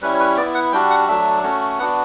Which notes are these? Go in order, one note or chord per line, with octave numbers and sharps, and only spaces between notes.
G3 C#4 E4 B4
C#5
B4
B3 E4 D5
F#5
G3 D4 F#4 G5
F#5
F#3 A3 D4 E5
A3 C#4 F#4
B3 D4 F#4 F#5